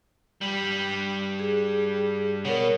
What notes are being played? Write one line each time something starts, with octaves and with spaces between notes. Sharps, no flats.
G2 G3
G#4
B2 A#4 C#5